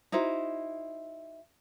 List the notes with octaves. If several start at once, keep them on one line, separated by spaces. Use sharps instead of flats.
D#4 E4 F#4 C5